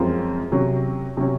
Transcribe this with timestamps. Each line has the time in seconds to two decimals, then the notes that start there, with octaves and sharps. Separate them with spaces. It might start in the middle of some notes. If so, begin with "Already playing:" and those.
Already playing: F#2 F3 G#3 C4 F4
0.52 C3 F#3 C#4
1.17 C3 F#3 C#4